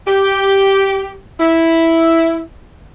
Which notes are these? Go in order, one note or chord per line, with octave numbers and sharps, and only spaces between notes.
G4
E4